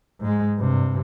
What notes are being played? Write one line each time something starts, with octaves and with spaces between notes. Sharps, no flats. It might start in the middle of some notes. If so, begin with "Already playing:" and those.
G#2 G#3
G2 C3